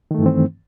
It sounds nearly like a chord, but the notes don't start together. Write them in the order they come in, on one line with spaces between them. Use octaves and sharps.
D#3 A3 G2 E3 C4